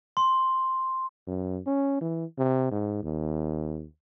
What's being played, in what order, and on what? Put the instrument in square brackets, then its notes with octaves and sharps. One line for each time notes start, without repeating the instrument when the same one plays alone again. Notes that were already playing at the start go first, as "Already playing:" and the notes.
[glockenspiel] C6
[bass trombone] F#2
C#4
E3
C3
G#2
D#2